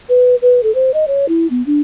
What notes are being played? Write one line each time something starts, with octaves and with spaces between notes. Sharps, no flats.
B4
B4
A4
C5
D#5
C#5
E4
B3
D4